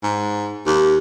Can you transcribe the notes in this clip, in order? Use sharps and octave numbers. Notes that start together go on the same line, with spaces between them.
G#2
D#2